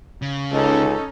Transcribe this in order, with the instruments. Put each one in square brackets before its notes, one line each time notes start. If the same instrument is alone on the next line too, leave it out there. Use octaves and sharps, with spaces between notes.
[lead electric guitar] C#3
[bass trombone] C#2 [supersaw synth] C#4 D#4 [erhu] A4